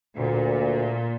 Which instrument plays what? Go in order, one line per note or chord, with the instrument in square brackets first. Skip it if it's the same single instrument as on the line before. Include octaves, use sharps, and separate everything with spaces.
[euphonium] D2 [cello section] A#2